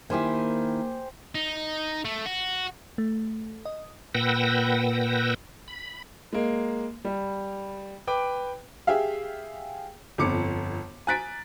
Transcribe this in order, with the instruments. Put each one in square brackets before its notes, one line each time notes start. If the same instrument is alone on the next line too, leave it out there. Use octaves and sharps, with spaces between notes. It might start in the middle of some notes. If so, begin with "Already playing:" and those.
[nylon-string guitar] D#3 E4 [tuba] A#3 [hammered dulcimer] G4 C5 G#5
[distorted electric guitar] D#4
A3
F#4
[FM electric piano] A3
D#5
[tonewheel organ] A#2 B4 F#5 G5 E6 A#6
B5
[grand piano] G#3 A#3
G3
B4 G5 D6
[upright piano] G4 G#4 E5 F5
G1 F2 D6 C#7
G#5 A#5 F#6 A6 B6 D7